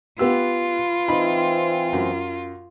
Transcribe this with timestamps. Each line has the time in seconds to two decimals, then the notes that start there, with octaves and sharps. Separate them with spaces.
0.19 B3 F4 G4 B4 E6
1.08 E3 C4 D#4 B5
1.93 F#2